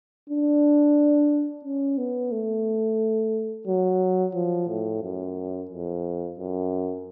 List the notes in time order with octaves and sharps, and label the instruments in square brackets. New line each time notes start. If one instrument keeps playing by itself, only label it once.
[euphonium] D4
C#4
B3
A3
F#3
F3
A2
F#2
F2
F#2